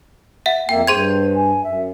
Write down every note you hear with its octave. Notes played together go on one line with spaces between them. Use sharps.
E5 F#5
F2 A#3 E5 G5
G2 G#4 C5 C6 G#6
G#5
F#2 E5